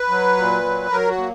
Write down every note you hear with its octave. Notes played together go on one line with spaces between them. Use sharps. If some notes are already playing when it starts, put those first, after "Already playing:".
Already playing: B4
F#3
A#2
F#3
F#3 A#4
F#4
A#3